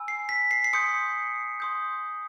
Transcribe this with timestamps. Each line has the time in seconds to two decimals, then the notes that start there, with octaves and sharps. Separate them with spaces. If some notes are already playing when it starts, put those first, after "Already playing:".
Already playing: G#5 B5 E6
0.08 C7
0.29 B6
0.51 C7
0.64 C7
0.73 C6 D#6 G6 C#7
1.60 C6 D#6 G6